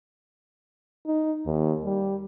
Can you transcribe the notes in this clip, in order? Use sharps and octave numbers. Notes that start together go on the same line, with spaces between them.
D#4
D#2
G3